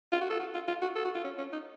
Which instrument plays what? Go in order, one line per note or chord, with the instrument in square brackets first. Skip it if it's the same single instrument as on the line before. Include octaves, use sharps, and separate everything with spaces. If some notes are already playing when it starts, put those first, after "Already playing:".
[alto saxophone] F4
F#4
A4
F#4
F4
F4
F#4
A4
F#4
F4
C#4
C#4
D#4